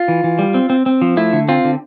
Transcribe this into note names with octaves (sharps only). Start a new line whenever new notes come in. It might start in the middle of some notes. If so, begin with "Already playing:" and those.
Already playing: F4
E3
E3
G3
C4
C4
C4
F3
A3 E4
D3
C4 F4
D3